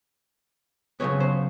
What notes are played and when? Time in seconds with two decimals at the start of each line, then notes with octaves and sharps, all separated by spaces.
1.00 C#3 F#3 B3 C#5
1.20 C5